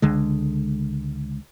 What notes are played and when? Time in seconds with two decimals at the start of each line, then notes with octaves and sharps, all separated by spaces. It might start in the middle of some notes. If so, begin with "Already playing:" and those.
0.02 C#2 D3 G#3